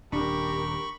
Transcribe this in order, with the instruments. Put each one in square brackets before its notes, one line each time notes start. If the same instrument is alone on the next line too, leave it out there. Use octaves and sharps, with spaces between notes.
[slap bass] D#1 [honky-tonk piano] D4 [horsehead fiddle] G4 A#4 [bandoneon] B5 C#6